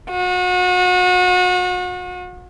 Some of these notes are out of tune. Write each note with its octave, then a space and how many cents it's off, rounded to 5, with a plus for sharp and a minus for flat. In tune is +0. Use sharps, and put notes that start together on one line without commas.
F#4 -35